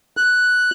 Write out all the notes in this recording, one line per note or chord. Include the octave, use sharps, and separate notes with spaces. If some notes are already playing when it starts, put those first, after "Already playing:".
F#6